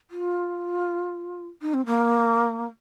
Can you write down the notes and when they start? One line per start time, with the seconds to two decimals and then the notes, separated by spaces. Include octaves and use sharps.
0.11 F4
1.62 D#4
1.74 C4
1.86 A#3